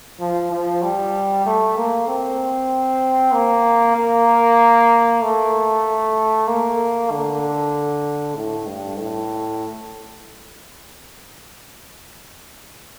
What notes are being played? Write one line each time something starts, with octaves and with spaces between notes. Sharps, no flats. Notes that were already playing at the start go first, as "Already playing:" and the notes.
F3
F3
G3
A3
A#3
C4
A#3
A#3
A3
A#3
D3
A2
G2
A2